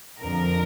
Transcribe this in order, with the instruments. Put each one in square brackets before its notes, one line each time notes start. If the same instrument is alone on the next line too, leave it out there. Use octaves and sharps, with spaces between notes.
[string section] F2 D3 F3 A#4